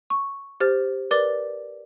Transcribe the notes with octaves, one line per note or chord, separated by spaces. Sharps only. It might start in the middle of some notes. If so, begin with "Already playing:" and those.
C#6
G4 C5 F6 A6
A#4 B4 D5 D6 A6 G7